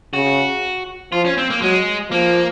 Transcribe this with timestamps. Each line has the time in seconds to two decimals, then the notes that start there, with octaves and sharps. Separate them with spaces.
0.13 C#3 F#4
1.12 F3 F4
1.25 C#4
1.38 C4
1.50 A#3
1.62 F#3 G#3
2.11 F3 A#3